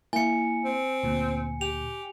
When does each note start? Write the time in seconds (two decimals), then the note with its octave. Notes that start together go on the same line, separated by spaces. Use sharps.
0.13 A#3 E4 G#5 C#7
0.65 C4
1.03 D2 A#2
1.61 G4 F7